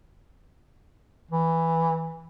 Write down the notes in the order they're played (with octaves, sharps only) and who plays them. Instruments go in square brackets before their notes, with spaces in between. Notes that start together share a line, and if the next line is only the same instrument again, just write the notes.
[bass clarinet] E3